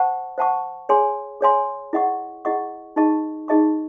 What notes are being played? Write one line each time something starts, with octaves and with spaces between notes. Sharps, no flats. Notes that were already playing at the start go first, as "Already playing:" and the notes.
Already playing: C5 F#5 A5 C#6
C5 F#5 A5 C#6
G#4 C#5 G#5 C6
G#4 C#5 G#5 C6
E4 G#4 D#5 F#5 C#6
E4 G#4 D#5 F#5 C#6
D#4 G#4 D#5 A5 C#6
D#4 G#4 D#5 A5 C#6